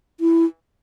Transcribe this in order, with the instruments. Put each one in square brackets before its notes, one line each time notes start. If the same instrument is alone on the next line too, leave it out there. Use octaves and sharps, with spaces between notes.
[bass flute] E4